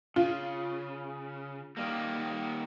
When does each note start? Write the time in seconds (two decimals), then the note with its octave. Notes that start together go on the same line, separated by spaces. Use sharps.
0.16 C#3 F4
1.77 D#3 G3 A#3